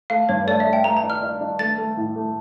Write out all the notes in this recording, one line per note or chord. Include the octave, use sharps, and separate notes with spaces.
A3 F5
G2 C#5
A3 D5
E5
A3
G5
A3 A#5
A#5
D4
F6
D4
D4
A3 A6
A3
A2
A3